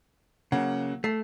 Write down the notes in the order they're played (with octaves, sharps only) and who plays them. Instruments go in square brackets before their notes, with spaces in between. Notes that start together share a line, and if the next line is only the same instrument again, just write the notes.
[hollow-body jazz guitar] C#3 [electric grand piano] F#3 A#3 F#5
[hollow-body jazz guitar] A3 [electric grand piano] C7